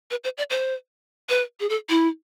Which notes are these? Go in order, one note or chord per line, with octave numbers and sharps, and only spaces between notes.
B4
C5
D5
C5
B4
G#4
A4
E4